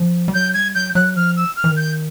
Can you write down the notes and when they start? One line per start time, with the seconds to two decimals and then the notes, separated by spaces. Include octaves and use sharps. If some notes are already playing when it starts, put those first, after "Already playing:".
Already playing: F3
0.28 G3
0.34 F#3 G6
0.54 G3 G#6
0.75 F#3 G6
0.95 F#3 F#6
1.16 F3 F6
1.37 E6
1.56 F6
1.64 E3
1.70 D#3
1.77 G6